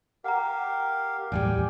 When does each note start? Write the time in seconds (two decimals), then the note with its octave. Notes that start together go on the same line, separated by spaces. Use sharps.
0.24 G4 A#4 F5 F#5 A#5
1.32 A1 D#2 G3 D5 G5 G#5